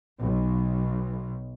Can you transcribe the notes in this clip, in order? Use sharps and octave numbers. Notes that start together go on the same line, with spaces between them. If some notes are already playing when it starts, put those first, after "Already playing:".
B1